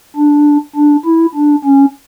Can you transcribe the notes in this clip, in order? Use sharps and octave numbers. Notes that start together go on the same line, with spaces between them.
D4
D4
E4
D4
C#4